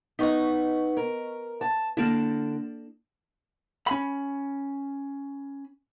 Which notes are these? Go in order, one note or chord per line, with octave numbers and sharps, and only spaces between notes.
B3 D#4 D#5 C#6 B6
A#4
A5
D3 A#3 D4 E4
C#4 B5